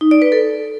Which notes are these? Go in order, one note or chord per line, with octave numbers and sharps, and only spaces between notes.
D#4
D5
B4
A4